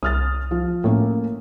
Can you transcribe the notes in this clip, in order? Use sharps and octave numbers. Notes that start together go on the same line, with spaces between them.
C2 D#6 F6 A6
F3 F4
A2 A3 A#3 C#4